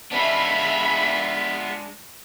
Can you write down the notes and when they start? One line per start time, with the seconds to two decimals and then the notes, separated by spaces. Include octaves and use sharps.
0.12 G#3 B3 D4 F4 E5 B5